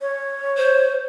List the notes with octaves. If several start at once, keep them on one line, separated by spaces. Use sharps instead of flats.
C#5
C5